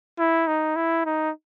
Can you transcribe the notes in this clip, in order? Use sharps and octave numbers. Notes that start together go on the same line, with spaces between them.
E4
D#4
E4
D#4